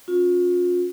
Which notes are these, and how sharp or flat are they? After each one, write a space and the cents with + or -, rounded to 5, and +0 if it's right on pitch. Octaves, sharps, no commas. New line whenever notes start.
C#4 -5 F4 +35